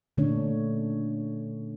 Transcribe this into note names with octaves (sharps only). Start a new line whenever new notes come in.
A#2 D3 A3 C#4 D4 C#5